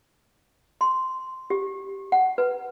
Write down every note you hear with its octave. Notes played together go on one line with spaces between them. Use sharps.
C6
G4
F#5
B4